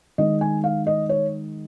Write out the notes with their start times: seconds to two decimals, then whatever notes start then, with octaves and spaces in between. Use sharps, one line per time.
0.18 D#3 G#3 D#5
0.41 G#5
0.64 F5
0.87 D#5
1.09 C#5